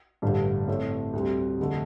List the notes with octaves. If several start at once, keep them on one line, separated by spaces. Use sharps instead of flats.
A1 G2 D3 A3 D4
A2 A3 C4
D2 D3 G3 C4
F1 D3 A3